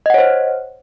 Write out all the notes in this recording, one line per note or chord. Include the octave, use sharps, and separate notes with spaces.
C5 C#5 D#5 F#5